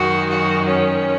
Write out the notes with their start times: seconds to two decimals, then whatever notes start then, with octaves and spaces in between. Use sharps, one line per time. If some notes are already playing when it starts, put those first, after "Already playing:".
Already playing: F#2 D#3 G#3 F#4
0.30 F#4
0.68 C#4